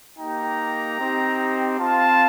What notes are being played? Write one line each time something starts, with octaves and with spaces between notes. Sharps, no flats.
A#3 D#4 G4 G5 A#5
C4 D#4 G4
C4 F4 F5 A5